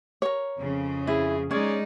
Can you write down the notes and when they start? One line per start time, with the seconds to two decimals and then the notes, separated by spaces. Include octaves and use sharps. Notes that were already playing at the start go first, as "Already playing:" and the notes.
0.22 A#4 C#5
0.59 F2 C#3
1.07 E4 G#4
1.51 G#3 C#4 D#4 G#4 C#5 D5